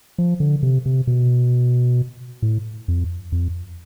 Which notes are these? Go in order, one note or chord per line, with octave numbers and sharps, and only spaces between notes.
F3
D3
C3
C3
B2
A2
F2
F2